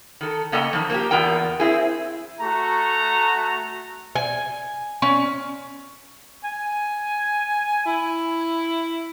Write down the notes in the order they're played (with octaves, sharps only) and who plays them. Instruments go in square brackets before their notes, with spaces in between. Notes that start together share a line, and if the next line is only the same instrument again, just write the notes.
[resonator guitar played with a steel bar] D#3 A4
C#3 A#3 A4 D#5 G5
D#3 F3
A#3 F4 G4
E2 B3 F4 A#4 G5
C4 E4 G#4
[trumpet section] A3 F#4 A#5
[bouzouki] G#5
C#4
[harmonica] G#5
E4